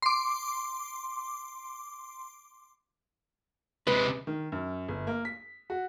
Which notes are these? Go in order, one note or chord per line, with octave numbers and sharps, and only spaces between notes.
C6 D6
C3 G#3 B4
D#3
F#2
G1
A#3
B6
F#4